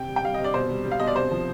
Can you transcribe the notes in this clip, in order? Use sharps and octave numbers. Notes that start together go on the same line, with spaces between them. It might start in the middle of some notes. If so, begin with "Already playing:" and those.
Already playing: C3 G5
G3
G5
G3 F5
D#5
C3
D5
B2 C5
G3
G3
F5
B2 D#5
D5
C3 C5
F3